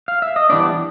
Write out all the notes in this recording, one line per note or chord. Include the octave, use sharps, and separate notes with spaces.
F5
E5
D#5
E3 G3 B3 D4 D5